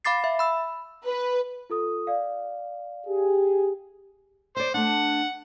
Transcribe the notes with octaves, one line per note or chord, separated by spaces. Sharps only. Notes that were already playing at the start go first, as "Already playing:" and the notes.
F5 B5 D6 A6 C7
E5
B5 E6
B4
F4 A4 D#6
D5 F5
G4 G#4
C5 D5 E5
A3 D4 F#5